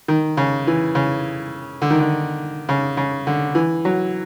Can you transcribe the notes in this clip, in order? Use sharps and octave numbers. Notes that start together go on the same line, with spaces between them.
D#3
C#3
E3
C#3
D3
D#3
D3
C#3
C#3
D3
E3
F#3